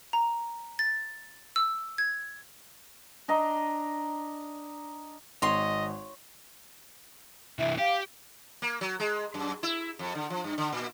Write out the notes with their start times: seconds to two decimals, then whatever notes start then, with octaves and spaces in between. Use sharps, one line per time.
0.13 A#5
0.79 A6
1.56 E6
1.98 G#6
3.28 D4 D#5 A#5
5.42 G#1 C#5 D#5 C6
7.59 C2 E3 E5
7.79 G4 F5
8.62 A#3
8.81 F#3
9.00 G#3
9.34 F#2
9.63 E4
9.99 F2
10.15 D3
10.30 F3
10.44 G2
10.58 D3
10.72 A#2